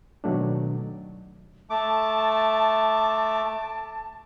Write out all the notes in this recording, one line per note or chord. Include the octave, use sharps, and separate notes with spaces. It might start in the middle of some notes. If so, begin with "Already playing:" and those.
B2 D#3 F#3 A3 D4
A3 A5 D6